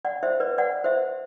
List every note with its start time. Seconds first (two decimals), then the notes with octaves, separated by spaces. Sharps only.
0.05 D5 F#5
0.23 C5 E5
0.40 B4 D5
0.58 D5 F#5
0.84 C5 E5